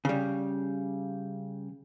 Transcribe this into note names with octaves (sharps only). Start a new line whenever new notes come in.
C#3 G3